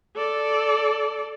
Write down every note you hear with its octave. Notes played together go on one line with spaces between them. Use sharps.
A4 D5